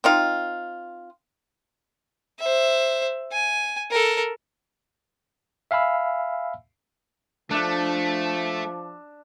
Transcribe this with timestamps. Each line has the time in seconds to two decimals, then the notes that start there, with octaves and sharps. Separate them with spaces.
0.04 C4 D#4 F4
2.40 C5 E5
3.32 G#5
3.90 A4 A#4
5.71 E5 F5 G#5 B5 E6
7.51 F3 A3 D4 E5